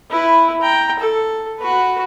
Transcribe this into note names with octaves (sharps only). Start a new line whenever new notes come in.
E4 B4
G5 A#5
A4
F#4 B4